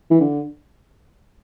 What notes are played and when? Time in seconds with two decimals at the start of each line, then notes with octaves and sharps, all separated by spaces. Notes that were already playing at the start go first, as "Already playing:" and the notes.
0.11 E3
0.20 D3